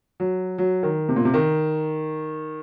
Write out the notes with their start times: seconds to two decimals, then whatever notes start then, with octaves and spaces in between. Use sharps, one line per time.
0.20 F#3
0.58 F#3
0.83 D#3
1.09 C3
1.16 A#2
1.25 C3
1.34 D#3